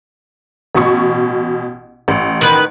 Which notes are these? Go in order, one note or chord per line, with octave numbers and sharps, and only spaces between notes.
A1 B2 C#6
A1
D#3 B4